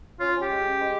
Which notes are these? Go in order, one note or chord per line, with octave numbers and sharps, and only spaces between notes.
C#4 F4
C#4
G4
G#3
C#4
G#3